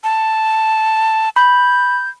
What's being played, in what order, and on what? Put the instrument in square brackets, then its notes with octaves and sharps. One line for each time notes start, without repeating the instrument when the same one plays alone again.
[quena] A5
[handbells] B5 [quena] G6